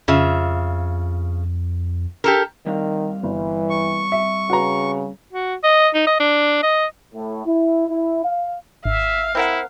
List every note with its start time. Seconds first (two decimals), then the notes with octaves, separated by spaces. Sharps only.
0.08 F2 C#3 F4 E5
2.24 G4 A4 A#4
2.66 D#3 G3 C4 F5
3.23 G1 E3
3.70 C#6
4.12 E5
4.50 C#3 F#4 B4 A#5
5.33 F#4
5.63 D#5
5.94 D#4
6.07 D#5
6.20 D4
6.63 D#5
7.14 A2
7.45 E4
7.88 E4
8.25 F5
8.85 G#1 E5 F5
9.35 C4 E4 A#4 F#5